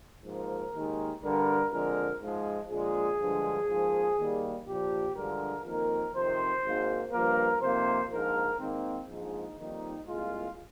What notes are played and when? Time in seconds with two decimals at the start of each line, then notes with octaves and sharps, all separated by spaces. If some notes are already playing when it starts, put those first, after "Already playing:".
0.25 G#2 F3 A#3 A#4
0.75 D#2 D#3 G#3
1.23 G2 D3 G3 A#4
1.72 F2 D3 G#3 A#4
2.22 G#2 F3 G#3
2.71 A#1 A#2 G#3 G#4
3.20 G2 D3 F3 G#3
3.69 G#2 F3 A#3
4.18 D#2 D#3 G3 A#3
4.67 A#1 A#2 F3 G4
5.15 G2 D3 F3 G#3 A#4
5.65 F2 D#3 A#3 A#4
6.14 F2 C3 D#3 C5
6.64 G#1 G#2 D#3 A#3
7.12 G2 F3 A#3 A#4
7.62 F2 C3 D#3 A#3 C5
8.10 A#1 G#2 F3 A#4
8.60 G#2 D#3 A#3 C4
9.09 A#1 G#2 F3 G#3 D#4
9.58 F2 D#3 G3 A#3 D#4
10.08 C2 A#2 G#3 F4